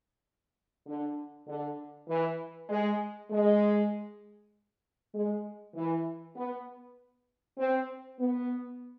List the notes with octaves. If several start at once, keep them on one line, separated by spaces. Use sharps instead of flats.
D3
D3
E3
G#3
G#3
G#3
E3
B3
C4
B3